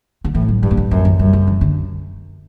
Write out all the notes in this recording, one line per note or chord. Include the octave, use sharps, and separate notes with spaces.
D3
A2 E3
F#3
G2 G3
A3
G3
F#2 F#3
E3
F#2 G3
C#3
E3
D3